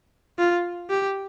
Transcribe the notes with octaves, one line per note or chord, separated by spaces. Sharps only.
F4
G4